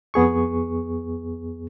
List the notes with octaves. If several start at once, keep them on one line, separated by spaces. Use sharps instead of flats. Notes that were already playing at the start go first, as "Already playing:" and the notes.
F2 B3 G#4 C#6